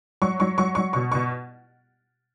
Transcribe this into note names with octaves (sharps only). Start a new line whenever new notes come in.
F#3 C#6
F#3 C#6
F#3 C#6
F#3 C#6
B2 C#6
B2 C#6